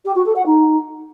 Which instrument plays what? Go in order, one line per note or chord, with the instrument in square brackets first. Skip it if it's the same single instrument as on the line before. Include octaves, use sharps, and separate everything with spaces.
[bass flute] G4
F#4
A4
F#5
D#4